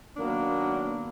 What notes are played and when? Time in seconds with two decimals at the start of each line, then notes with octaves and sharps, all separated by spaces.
0.17 D#3 F#3 A#3 B3 D4